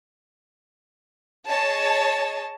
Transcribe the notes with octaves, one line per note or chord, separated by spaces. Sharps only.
G#4 C#5 D#5 A5